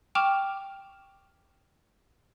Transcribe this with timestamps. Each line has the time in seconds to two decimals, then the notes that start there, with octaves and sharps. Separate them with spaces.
0.15 G5 C#6 D6 F6 E7 F7